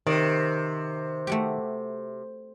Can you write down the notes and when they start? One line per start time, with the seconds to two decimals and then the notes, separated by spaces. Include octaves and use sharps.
0.07 C3 D#3 D5
1.27 A3 F#4 G4